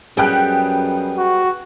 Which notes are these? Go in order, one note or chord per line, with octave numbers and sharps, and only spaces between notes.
F#2 G3 B3 G#4 G5 F#6
F#4